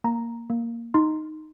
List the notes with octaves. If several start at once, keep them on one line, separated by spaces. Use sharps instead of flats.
A#3 A#5
A#3
D#4 C6